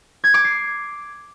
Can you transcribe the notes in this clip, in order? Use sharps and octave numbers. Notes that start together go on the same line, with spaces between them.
G#6
D6
C7